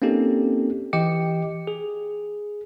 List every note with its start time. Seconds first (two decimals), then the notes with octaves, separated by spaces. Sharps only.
0.02 A#3 C4 C#4 D#4 G4 A4
0.93 E3 G4 D#5 G5 D6 C#7
1.67 G#4